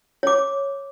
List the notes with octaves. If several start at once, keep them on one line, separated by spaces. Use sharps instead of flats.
C#5 D6